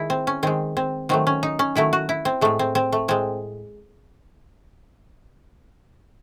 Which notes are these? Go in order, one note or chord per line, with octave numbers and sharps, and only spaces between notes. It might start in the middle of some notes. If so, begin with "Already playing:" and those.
Already playing: D#3 G#3 E4
C4
C#4
D#3 G#3 C4
C4
D#3 F#3 A3 C4
C#4
D#4
C#4
D#3 F#3 A3 E4
F#4
E4
C4
A2 G#3 A3
C4
C4
A3
A2 G#3 C4